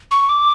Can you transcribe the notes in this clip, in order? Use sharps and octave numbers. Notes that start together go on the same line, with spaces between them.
C#6
D6